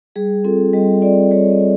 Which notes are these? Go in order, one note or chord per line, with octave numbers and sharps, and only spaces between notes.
G3 G#4
C4 F4 A4
G3 D#5
C4 F4 D5
G3 C#5
D#5
F4